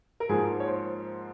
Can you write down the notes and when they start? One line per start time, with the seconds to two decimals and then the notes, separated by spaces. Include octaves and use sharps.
0.20 A#4
0.29 G#2 F3 A#3 G#4
0.60 C#5
0.67 C5